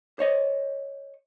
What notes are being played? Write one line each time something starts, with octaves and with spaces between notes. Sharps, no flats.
C5 C#5 D#5